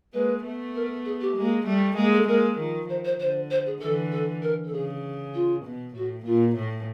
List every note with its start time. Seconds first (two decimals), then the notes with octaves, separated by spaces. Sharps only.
0.13 G#3 A#3 B4
0.44 A3 B3
0.75 A#4
1.05 G#4
1.21 G4
1.36 G#3 A#3
1.67 G3 A3
1.97 G#3 A#3 G#4
2.13 A4
2.28 G#3 A#3 A#4
2.59 D#3 F3
2.89 D#3 C5
3.05 C5
3.20 D3 C5
3.50 C5
3.66 G#4
3.80 D3 E3 A4
4.12 A4
4.42 A#4
4.64 A4
4.73 C#3 G#4
5.34 F4
5.65 B2
5.95 A2 F#4
6.26 A#2 F4
6.56 A2